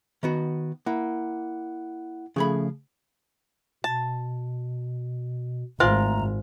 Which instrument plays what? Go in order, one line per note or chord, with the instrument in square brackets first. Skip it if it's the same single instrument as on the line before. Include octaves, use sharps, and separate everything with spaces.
[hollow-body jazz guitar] D#3 B3 F#4
[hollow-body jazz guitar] A#3 [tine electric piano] E4 F#5
[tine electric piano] C#3 A3 [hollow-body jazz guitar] F3 G#4 B5
[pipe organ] B2 [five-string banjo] A5
[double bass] G#1 [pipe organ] A3 A#5 [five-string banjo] F4 [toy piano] C5 E5 G#5